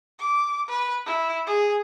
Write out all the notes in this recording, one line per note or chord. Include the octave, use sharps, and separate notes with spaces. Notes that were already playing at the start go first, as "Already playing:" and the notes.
D6
B4
E4
G#4